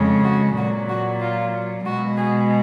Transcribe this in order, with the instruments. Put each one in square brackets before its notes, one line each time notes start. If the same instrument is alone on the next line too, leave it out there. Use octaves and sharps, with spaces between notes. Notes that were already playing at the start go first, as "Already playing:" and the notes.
Already playing: [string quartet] F2 C#3 G#3
F#4
A#2 F#3 F#4
F#4
F4
B2 G#3 F#4
G#4